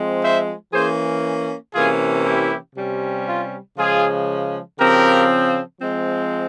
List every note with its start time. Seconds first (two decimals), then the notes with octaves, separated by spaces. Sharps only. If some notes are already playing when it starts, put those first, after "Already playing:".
Already playing: F3 G#3 C4
0.22 C5 E5
0.73 E3 A#3 C#4 G#4 C5
1.74 C3 E3 A#3 C#4 F4 G#4
2.25 E4 G4
2.76 C3 G3 C#4
3.27 F4
3.77 C#3 F3 G#3 F4 G#4
4.79 C#3 F3 C4 G4 A#4
5.80 F3 G#3 C4